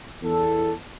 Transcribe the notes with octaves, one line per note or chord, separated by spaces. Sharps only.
E2 A4